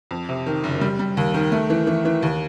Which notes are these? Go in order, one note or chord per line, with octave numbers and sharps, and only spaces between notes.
F2
C3
D#3
F#1
G3
G3
D#2
D#3
A3
E3
E3
E3
D#2